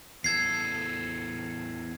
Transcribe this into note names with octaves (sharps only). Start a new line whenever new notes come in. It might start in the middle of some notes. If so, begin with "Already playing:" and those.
E2 A4 G#6 C7